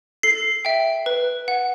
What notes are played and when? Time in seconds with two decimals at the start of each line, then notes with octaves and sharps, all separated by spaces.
0.23 A4 C7
0.65 E5 G5
1.06 B4
1.48 F#5